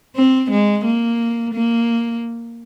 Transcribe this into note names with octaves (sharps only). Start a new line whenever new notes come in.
C4
G#3
A#3
A#3